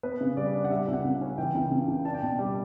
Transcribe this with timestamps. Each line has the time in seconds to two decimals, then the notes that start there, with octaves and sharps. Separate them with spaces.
0.03 B3 B4
0.21 C#3
0.37 G3 D5
0.54 D4
0.64 F#5
0.71 G3 E5
0.88 C#2
0.93 F#5
1.04 C#3
1.21 C#4
1.38 E3 G5
1.55 C#2
1.71 C#3
1.88 C#2
2.05 D4 A5
2.14 G5
2.22 B2 A5
2.39 G3